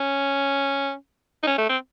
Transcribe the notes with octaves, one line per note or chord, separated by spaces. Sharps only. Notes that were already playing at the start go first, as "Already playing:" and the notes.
Already playing: C#4
D#4
C#4
A3
C4